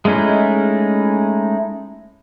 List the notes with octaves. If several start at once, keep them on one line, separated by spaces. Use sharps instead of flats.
G#3 A3 C#4 D#4 E4